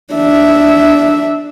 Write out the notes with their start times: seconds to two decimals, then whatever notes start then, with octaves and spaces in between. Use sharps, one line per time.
0.14 D4 E5